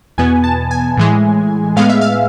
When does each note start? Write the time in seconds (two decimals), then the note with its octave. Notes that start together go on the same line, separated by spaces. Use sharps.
0.18 E2 B2 B3 G#5
0.44 A5
0.71 G#5
0.97 A2 E3 G#3
1.76 A2 G#3 B3 F5
1.89 E5
2.01 F5